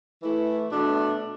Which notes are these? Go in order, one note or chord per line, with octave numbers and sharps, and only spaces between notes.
E3 A3 E4
B2 A3 D4